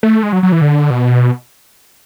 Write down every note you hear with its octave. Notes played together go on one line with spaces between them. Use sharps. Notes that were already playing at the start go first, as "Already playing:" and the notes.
A3
G#3
F#3
F#3
E3
D3
B2